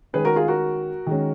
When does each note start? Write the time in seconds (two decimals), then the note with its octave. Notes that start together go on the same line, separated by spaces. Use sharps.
0.13 D#3 G#3 C#4 G#4 B4
0.25 F#4 A#4
0.36 F4 G#4
0.48 F#4 A#4
1.07 D#3 G#3 C#4